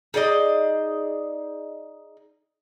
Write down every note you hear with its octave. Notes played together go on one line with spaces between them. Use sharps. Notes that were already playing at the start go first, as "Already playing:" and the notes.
D#4 G#4 D5 D#5